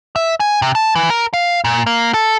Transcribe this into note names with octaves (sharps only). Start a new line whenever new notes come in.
E5
G#5
C3
A5
E3
A#4
F5
A#2
A#3
A4